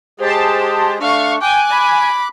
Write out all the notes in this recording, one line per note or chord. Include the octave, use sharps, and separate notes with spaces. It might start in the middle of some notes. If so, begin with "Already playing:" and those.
G#3 G4 G#4 C5 A5
A3 D4 F5 C#6
G5 G#5 D6 F#6
B5